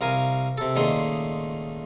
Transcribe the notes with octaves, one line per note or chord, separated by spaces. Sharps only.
C2 A#4 F5 G#5
C3 A4
C#2 A#2 D#3 A3 G#4 C6